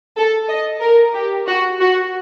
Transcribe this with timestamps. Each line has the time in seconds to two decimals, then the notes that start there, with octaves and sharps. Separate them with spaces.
0.16 A4
0.48 D#5
0.81 A#4
1.14 G4
1.47 F#4
1.80 F#4